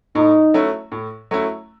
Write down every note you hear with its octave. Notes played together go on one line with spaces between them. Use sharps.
A2 D#4
F#3 A3 C#4 E4
A2
F#3 A3 C#4 E4